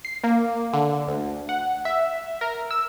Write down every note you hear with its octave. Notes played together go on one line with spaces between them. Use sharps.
C7
A#3
D3
D2
F#5
E5
A#4
E6